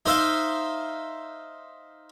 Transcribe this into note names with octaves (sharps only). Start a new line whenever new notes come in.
D#4 C5 E5 F5